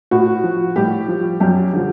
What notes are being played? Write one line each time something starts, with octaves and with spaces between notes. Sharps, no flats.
A2 F#4
F3
A2 G3 G4
F3
F#2 G3 G4
D3 F3